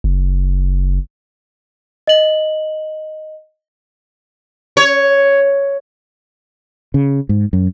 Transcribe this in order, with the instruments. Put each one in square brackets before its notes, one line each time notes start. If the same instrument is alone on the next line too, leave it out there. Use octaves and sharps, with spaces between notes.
[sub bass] F#1
[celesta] D#5 F#7
[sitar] C#5
[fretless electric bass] C#3
G#2
F#2